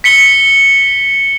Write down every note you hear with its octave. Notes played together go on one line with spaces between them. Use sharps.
B6 C#7 G7